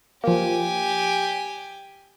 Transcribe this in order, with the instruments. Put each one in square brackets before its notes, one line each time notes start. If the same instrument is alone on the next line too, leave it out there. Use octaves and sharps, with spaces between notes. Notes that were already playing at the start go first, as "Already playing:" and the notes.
[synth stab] F3 A#3 [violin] G4 G#5